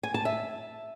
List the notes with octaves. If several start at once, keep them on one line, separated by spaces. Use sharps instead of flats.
G#5
A5
E5